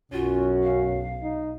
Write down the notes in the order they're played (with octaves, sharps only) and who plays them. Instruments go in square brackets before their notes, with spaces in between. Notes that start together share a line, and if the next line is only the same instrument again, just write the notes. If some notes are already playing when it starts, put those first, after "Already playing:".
[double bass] B1 [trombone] F#2 [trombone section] C#4 F#4 [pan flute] F4
[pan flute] F5
[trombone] D#4